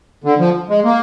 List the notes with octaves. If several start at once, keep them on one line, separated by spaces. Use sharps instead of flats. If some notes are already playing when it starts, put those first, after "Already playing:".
D3
F3
G#3
A#3